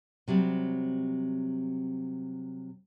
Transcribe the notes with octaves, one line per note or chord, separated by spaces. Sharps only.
C3 F#3 G3 C4